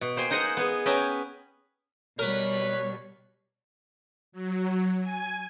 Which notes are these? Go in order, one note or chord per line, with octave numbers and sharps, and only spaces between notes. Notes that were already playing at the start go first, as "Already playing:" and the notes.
B2
A#3 C5 G5 G#5 C6
D#4 C5 D#5 F#5 G#5 A#5
B3 G#4
B3 C#4 E5 G5 G#5 A#5
B2 G3 A#4 B4 C#5
F#3
G#5